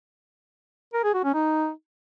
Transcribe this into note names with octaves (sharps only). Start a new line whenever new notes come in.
A#4
G#4
F#4
C#4
D#4